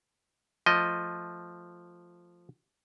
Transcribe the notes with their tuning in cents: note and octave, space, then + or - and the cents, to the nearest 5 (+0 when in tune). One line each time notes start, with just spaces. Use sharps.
F3 +0 A3 +0 D#5 +5